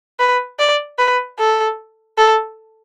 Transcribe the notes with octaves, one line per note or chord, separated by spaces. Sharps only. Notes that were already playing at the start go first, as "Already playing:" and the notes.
B4
D5
B4
A4
A4